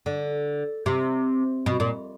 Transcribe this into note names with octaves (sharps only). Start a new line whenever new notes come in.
D3
C3
B2
A#2